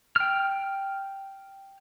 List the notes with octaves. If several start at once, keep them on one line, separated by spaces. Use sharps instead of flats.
G5 F6